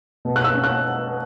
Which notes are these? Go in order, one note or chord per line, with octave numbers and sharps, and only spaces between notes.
B2
F#6
E6
C#4
F#6